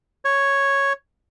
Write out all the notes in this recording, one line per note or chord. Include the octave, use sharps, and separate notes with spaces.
C#5